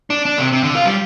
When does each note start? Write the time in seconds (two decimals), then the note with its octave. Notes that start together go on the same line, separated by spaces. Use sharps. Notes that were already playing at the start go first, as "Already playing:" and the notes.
0.10 D4
0.25 D4
0.39 C3
0.52 C3
0.63 D3
0.74 F4
0.85 G3